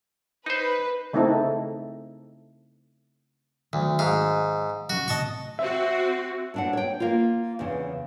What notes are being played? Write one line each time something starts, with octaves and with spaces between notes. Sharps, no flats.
D#4 B4 C5
C#3 A3 C4 D#4 E4 A4
D2 D#3 F#3
G#2 F5
C#3 F#3 F#4
A2 C3 D#5 A5 C#6
C4 F#4 E5
A2 D4 F#5
C#5 G5
A#3 F4
E2 C#3